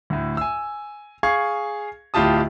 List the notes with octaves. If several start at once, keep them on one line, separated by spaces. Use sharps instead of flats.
D2 A2
G#5 E6
G#4 F5 C#6 G#6
D1 A2 F4 G4 A5 D#6